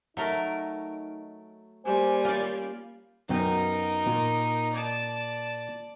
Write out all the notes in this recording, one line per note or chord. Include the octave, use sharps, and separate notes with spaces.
F#3 A3 D#4 A#4
G3 A#3 C5 G#5
C#4 F4 D5
F#2 B3 D#4 A#4 G5
A#2
D5 A5